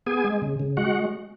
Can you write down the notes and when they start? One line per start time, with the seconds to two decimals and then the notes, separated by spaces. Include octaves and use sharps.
0.07 B3 G#4 G#5
0.24 G#3
0.42 C#3
0.60 C#3
0.77 G#3 F#4 F#5